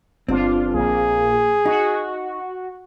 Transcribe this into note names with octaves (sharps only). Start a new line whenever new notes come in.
G1 C4 D4 F4
A#1 A#3 G#4
D#4 F#4